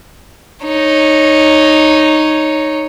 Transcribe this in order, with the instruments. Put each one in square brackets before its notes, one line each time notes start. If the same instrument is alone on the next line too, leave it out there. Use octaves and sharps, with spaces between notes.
[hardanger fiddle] D#4 C#5